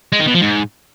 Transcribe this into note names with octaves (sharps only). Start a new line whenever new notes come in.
G#3
D#3
B2
F3
G#2